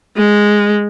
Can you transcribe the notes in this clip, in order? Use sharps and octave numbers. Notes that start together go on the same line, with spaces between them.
G#3